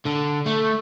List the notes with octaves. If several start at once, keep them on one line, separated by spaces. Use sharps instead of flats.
D3
A3